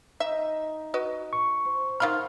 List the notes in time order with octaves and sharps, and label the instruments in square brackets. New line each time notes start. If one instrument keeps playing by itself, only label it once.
[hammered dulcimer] D#4 [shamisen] E5
[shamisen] F#4 B4 D#5
[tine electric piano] C#6
[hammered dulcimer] C5
[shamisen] D#3 F4 B5 [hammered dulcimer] F5 F#5 C6 [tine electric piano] F6